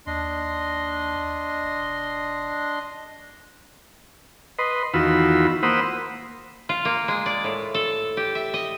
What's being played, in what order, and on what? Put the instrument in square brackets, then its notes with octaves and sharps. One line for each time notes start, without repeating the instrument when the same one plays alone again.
[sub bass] D#2 [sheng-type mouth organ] D4 D#5 C6
[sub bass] E1
[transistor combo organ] B4 D#5 C6
E2 D#3 F4 F#4 B5 E6
A#3 C5 F#5 B5 D#6 E6
[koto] F4
A#3
G#3
D5
A2
A4
G4
E5
D#5